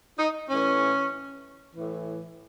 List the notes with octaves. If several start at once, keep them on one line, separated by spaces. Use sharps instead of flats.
D#4
A2 E3 C#4
A2 E3